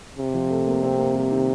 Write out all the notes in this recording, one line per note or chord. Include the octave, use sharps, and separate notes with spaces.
C3
F3
A3
A#3
C4
A#3
G3
D#3